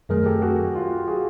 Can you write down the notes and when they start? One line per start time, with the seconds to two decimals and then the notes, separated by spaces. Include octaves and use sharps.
0.09 F#2 D#3 F#3 A3 G#4 A#4
0.25 G4 A4
0.42 F#4 G#4
0.75 F4 G4
1.08 F#4 G#4